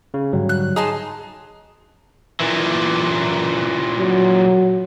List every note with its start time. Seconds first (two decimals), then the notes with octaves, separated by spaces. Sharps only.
0.14 C#3
0.33 G#2 D3 F#3 G3
0.49 F#6
0.76 D#4 G#4 A5 C6
2.40 A#2 E3
3.98 F#3